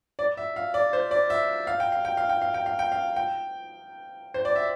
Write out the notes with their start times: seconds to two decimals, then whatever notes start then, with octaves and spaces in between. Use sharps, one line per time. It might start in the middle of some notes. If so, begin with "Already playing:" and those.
0.19 D5
0.37 E5
0.56 F5
0.74 D5
0.93 C5
1.11 D5
1.30 E5
1.67 F5
1.80 G5
1.92 F5
2.05 G5
2.17 F5
2.29 G5
2.42 F5
2.54 G5
2.66 F5
2.79 G5
2.92 F5
3.16 G5
4.34 C5
4.45 D5
4.56 E5